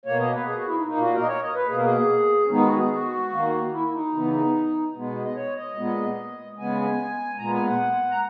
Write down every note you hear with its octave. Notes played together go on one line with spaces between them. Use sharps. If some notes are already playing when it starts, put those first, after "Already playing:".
B2 A#3 C#5
D#5
B4
G#4
F#4
E4
D#4
A#2 A#3 D#4
F#4
A#4
D#5
C#5
D#5
B4
B2 A#3 G#4
A#4
G#4
C#4
D#3 G#3 B3 D#4
G#4
F#4
G#4
F#4
D#3 A#3
E4
E4
D#4
C#3 E3 B3
B2 G#3 B3
D#5
C#5
D#5
A#2 G#3 B3
C#3 G#3 B3 G#5
A#2 G#3 B3 A#5
G#5
F#5
A#5